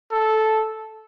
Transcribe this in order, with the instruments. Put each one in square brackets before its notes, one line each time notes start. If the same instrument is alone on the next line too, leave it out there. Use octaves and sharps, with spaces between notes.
[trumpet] A4